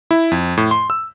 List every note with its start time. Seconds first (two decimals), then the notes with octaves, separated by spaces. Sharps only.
0.11 E4
0.31 F2
0.57 A2
0.71 C6
0.90 E6